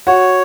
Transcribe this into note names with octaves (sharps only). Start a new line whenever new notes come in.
F#4 C#5